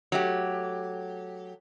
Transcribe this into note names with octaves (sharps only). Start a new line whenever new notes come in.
F#3 A3 G4